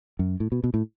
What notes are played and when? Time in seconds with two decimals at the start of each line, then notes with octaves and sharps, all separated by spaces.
0.19 F#2
0.40 A2
0.52 B2
0.64 B2
0.74 A2